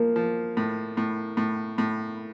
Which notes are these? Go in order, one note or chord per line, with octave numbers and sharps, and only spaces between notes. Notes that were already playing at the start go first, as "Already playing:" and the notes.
Already playing: F3 A#3
F3
A2
A2
A2
A2